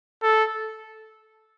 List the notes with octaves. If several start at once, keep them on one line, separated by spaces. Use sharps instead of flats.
A4